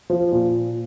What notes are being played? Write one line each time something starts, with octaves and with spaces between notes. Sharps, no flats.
F3
A#2